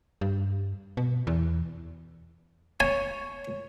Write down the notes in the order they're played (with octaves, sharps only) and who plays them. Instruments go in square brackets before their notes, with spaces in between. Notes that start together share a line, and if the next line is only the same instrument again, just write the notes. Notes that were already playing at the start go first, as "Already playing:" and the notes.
[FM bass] G2
B2
E2
[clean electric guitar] C#5 [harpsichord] G#5